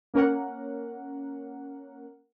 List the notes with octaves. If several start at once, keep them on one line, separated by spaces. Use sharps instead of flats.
A#3 C#4 A#4 F#5